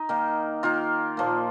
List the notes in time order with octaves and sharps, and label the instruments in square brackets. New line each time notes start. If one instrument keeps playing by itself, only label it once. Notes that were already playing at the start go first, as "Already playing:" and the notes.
Already playing: [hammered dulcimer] D#4
D#3 A#3
D#3 A#3 F4
A#2 F3 A#3